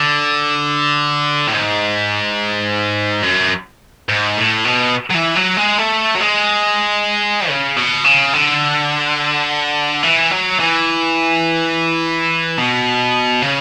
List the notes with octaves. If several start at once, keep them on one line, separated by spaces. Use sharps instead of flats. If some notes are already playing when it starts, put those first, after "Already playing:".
Already playing: D3
A2
G#2
F#2
G#2
A2
B2
F#3
E3
F#3
G#3
A3
F#3
G#3
C#3
B2
C#3
D3
E3
F#3
E3
B2
C#3